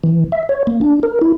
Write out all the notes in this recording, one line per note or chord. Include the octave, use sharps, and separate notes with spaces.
E3
E5
C#5
A#3
D4
A#4
E4